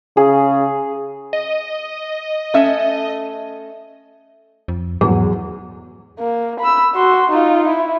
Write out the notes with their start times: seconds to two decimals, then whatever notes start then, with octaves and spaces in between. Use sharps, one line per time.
0.17 C#3 G#4
1.33 D#5
2.54 A3 C#4 E5
4.68 F2
5.01 E2 G#2 F#3 G#4
6.19 A#3
6.60 B5 E6
6.95 F#4 C6
7.31 D#4 F4
7.68 E4